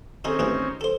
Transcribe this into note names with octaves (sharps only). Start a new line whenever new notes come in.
D#3 C4 C#4 D#4 G#4 A4
A1 G#4 B4
A4 C5